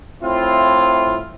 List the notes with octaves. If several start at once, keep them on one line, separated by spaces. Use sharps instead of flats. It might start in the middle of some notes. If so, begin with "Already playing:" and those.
A2 C4 E4 F4